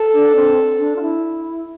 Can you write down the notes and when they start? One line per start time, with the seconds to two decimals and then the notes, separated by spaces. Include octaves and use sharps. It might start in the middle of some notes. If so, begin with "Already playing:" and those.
Already playing: A4
0.14 D4
0.35 C4
0.79 D4
0.96 F4
1.01 E4